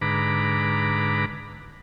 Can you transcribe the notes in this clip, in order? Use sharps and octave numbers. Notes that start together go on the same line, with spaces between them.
G#2 D3 B4 A#5 B5 D6